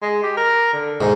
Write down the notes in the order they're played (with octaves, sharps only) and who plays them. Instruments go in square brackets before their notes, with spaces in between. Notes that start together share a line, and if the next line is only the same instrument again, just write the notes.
[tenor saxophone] G#3
G4
A#4
D3
[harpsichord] G#2 [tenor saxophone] D#3